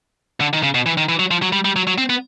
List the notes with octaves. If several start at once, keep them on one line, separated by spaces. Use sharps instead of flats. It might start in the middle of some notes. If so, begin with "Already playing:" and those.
D3
D#3
C#3
B2
E3
D#3
E3
F#3
F3
F#3
G3
G3
F#3
F#3
C4
B3